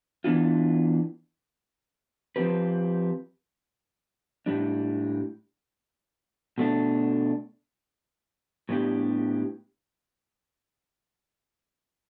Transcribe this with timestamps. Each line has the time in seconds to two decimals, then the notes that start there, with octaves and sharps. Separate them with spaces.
0.24 E3 B3 D4 F4
2.36 F3 C4 G4 B4
4.46 A2 G3 D4
6.58 B2 A3 D4
8.69 A2 G3 B3 D4 G4